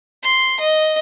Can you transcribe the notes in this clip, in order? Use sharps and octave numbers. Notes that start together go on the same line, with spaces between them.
C6
D#5